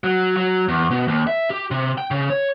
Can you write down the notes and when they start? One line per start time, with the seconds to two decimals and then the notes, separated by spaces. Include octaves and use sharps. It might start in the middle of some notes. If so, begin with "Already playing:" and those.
0.04 F#3
0.37 F#3
0.69 E2
0.91 B2
1.08 D#2
1.27 E5
1.50 G4
1.71 C3
1.98 G5
2.11 C#3
2.30 C#5